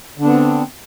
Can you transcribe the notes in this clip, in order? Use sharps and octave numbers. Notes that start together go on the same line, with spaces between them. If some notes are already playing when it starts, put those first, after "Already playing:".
D3 B3 C4 D4